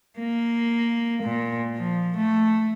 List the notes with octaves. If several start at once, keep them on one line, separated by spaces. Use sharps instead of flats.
A#3
A#2
F3
A3